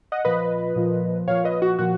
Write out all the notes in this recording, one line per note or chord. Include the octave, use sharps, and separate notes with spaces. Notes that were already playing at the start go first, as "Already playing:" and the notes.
D#5 F#5
A#2 F3 B4 D#5
A#2 F3
A#2 F3 C#5 F5
B4 D#5
F#4
A#2 F3 F#4